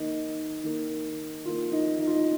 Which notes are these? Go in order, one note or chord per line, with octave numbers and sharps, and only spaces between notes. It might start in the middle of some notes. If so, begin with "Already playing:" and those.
Already playing: D#3 A#3 D#4
D#3 A#3
D#3 A#3 F4
D#4
D#4
F4
D#4